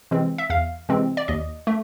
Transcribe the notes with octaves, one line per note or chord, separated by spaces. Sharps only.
C3 E3 G#3 C4
E5
E2 F5
C3 E3 G#3 C4
D5
D#2 D#5
A3